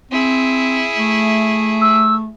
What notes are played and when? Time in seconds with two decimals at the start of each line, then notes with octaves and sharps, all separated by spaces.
0.12 C4 E4 G#4
0.97 A3
1.81 E6